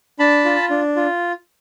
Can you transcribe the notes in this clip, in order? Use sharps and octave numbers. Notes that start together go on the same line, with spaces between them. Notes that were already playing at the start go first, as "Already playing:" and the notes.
D4 A5 B5
F4
D4
F4